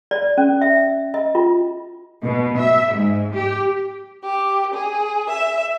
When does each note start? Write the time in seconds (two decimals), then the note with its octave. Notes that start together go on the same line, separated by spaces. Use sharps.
0.11 D5
0.38 C#4
0.61 E5
1.14 D#5
1.35 F4
2.23 B2
2.57 E5
2.93 G#2
3.34 G4
4.23 G4
4.73 G#4
5.30 E5